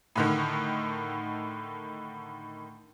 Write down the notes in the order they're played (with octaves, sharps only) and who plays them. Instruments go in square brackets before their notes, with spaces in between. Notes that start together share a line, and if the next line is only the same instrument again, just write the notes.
[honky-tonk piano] A2 D3 D#3